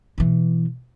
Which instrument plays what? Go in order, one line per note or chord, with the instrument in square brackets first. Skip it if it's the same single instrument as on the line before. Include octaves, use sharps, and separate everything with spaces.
[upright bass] B2 E3